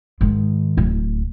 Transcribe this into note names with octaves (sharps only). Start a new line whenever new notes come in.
G#2 D#3
D1